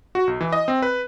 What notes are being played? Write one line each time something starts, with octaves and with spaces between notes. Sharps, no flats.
F#4
B1
E3
D#5
C4
B4